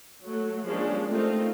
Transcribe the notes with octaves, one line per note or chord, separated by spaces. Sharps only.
F#3 A3
F3 G3 G#3 A#3 C#4 D4
A3 A#3 C4 D#4 F4